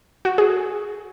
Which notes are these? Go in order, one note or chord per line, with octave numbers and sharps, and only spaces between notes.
F#4
G#4